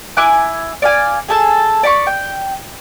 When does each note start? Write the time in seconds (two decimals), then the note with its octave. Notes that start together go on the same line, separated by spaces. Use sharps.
0.17 E4 G#5 D6 F#6
0.82 D5 F5 G#5
1.28 G#4 A4 A5
1.83 D5 B5 C#6
2.07 G5